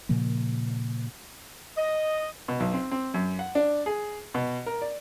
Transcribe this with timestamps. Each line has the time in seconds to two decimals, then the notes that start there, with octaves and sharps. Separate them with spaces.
0.09 A#2 C#3 F3 A#3
1.78 D#5
2.48 B2
2.60 B1
2.73 C4
2.92 C4
3.14 F#2
3.39 F#5
3.55 D4
3.86 G#4
4.34 B2
4.66 A#4
4.82 D5